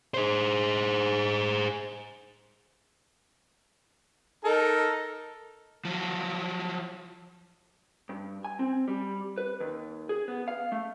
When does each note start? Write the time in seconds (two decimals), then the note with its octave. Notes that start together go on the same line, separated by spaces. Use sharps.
0.14 G#4 C5
4.45 D#4 A4 A#4
5.85 F3 F#3
8.09 G2
8.45 G#5
8.59 C4
8.88 G3
9.38 B4
9.60 D#2
10.09 G#4
10.28 B3
10.48 F5
10.72 A3